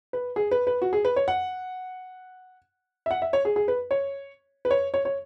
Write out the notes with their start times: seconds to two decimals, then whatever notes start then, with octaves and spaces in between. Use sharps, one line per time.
0.13 B4
0.36 G#4
0.51 B4
0.67 B4
0.82 F#4
0.93 G#4
1.05 B4
1.16 C#5
1.28 F#5
3.06 E5
3.11 F#5
3.22 E5
3.33 C#5
3.45 G#4
3.56 G#4
3.68 B4
3.91 C#5
4.65 B4
4.71 C#5
4.94 C#5
5.05 C#5